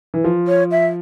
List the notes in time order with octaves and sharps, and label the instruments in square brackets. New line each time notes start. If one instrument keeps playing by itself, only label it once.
[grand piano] E3
F3
[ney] C#5
E5